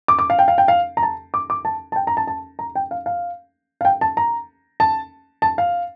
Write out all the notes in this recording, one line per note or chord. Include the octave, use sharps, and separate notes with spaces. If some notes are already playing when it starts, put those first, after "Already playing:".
D6
D6
F5
G5
F5
G5
F5
A#5
A5
D6
D6
A5
A5
G5
A#5
A5
A5
A#5
G5
F5
F5
F5
G5
A5
A#5
A5
A5
F5